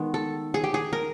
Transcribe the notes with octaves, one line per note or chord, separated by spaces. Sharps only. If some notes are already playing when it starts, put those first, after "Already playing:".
Already playing: D#3 G#3 B3
A4
G#4
G4
G#4
A#4